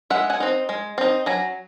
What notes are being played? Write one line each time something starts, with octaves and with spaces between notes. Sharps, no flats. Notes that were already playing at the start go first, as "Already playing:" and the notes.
G#3 E5 F#5
F#5 G#5
C4 D#4
G#3
C4 D#4
F#3 G#5 A#5